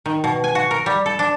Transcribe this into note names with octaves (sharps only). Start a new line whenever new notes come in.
D#3
B2
G#5
F#4
A#4
G3
A4
D4